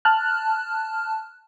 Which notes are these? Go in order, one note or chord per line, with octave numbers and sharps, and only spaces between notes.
A5 F6 F#6